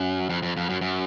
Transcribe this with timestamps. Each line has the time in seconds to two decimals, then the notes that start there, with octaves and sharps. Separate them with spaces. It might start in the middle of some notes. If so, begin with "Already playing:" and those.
Already playing: F#2
0.29 F2
0.42 F2
0.57 F2
0.70 F#2
0.81 F#2